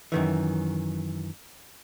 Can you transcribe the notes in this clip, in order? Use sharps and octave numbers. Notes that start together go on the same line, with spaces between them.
F#2 D#3 E3